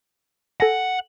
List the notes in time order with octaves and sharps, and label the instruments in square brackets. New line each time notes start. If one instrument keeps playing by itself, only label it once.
[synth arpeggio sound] A4 G#5 A#6 [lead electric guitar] F#5